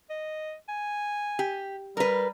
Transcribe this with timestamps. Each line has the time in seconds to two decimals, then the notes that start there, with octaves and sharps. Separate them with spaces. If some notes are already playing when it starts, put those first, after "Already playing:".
0.10 D#5
0.69 G#5
1.39 G4
1.97 G3 A#4 B4